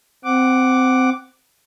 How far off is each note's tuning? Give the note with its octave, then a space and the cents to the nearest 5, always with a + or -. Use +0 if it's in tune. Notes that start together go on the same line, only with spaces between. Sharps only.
C4 -15 F#5 +5 D6 +0